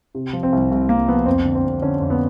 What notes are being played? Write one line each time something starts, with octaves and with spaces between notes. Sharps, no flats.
C3
F3
C4
C2
C2
C2 A#3
F3 B3
F2 C4
D3
C4
F2
D3 C#4
F2
B3